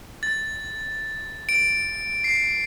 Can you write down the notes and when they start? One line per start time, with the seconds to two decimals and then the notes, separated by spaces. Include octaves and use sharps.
0.23 A6
1.49 D7
2.24 C7